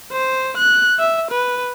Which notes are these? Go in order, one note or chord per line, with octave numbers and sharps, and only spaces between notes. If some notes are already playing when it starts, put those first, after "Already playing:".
C5
F#6
E5
B4